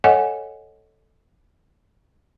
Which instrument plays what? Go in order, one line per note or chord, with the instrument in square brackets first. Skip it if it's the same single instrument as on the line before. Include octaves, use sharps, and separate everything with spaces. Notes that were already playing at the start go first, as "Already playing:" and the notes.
[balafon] A4 C#5 D#5 F#5 G#5